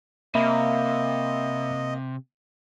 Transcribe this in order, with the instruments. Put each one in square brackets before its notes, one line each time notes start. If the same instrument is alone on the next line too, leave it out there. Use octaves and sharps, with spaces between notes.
[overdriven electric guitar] C3 [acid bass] A#3 [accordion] D#5 [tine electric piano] E5 B5